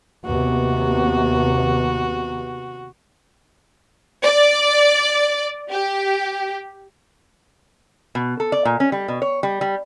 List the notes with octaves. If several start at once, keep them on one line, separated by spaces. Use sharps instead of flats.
D#2 C3 B3 F#4
D5
G4
B2
A4
D5
A#2
C#4
G3
B2
C#5
G3
G3